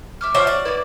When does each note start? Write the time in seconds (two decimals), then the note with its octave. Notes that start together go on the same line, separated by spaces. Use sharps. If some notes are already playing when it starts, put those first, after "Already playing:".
0.21 E5 D6 F6
0.35 F3 F#4 C5 C#5 E5 D6 F6
0.47 D5
0.65 A#3 B3 E4 B4